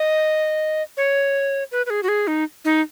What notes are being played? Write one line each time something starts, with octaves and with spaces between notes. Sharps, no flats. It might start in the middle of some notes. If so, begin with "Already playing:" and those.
Already playing: D#5
C#5
B4
B4
G#4
F#4
G#4
D#4
D#4